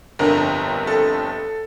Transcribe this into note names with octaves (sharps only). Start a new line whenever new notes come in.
G1 F2 D3 A#4
A4